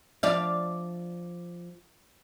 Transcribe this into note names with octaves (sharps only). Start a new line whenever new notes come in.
F3 D5 F5